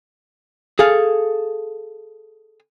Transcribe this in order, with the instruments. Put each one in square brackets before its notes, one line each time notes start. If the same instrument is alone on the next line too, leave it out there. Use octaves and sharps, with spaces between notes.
[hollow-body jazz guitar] G#4 A4 F5